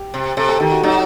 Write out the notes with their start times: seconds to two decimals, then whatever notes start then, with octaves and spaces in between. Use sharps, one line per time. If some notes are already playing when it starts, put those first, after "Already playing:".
Already playing: G4
0.14 C3
0.37 C3 A4
0.49 A4
0.60 D#3 G4
0.72 F#4
0.83 F#3 D#4